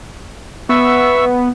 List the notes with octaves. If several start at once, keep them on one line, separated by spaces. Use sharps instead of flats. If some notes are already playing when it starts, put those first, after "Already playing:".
B3 E5 C#6 E6